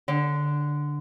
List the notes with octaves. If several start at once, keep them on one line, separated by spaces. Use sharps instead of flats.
D3